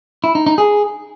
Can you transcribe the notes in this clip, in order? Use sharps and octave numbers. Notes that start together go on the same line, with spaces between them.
E4
D#4
D#4
G#4